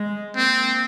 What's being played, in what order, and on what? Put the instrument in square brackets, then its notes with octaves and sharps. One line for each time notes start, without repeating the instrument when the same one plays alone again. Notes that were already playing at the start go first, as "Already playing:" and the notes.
Already playing: [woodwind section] G#3
[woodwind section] A#3 [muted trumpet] C4